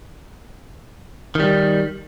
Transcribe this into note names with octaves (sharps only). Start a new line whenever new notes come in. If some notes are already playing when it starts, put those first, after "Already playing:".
D#3 G3